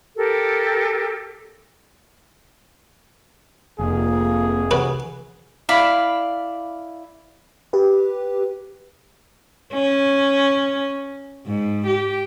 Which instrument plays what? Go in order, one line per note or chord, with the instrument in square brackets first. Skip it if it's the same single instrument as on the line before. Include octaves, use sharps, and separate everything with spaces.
[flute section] G4 A4 A#4
[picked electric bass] F1 [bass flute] A#3 [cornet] G#4
[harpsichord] C3 F#4 B4
[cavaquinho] E4 D5 F5 B5
[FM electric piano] G4 B4
[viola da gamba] C#4
G#2
G4